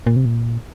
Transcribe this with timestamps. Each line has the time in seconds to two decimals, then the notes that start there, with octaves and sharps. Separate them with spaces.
0.07 A#2
0.16 C3
0.25 A#2